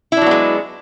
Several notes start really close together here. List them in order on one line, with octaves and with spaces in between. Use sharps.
E4 D4 F#3 B3 G#3